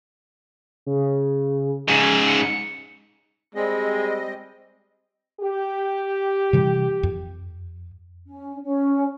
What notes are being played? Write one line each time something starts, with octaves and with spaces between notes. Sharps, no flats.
C#3
G#2 C#3 G#5
C#7
G3 G#3 C4 D#5
G4
C3 E3 G3
F2
C#4
C#4